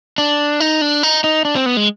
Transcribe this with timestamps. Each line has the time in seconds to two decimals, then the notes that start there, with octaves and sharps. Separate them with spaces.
0.18 D4
0.60 D#4
0.81 D4
1.03 D#4
1.24 D#4
1.45 D4
1.56 C4
1.66 B3
1.77 G#3